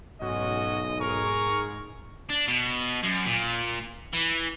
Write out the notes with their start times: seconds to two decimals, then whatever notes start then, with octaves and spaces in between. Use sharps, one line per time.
0.22 B1 G#2 C#4 F#4 D#5
1.00 G#4 A#4 C#6
2.30 D4
2.48 B2
3.03 F#2
3.27 A#2
4.13 E3